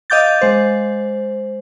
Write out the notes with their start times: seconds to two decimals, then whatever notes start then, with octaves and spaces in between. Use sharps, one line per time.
0.10 D#5 F5 D6 G6 A6
0.42 G#3 C5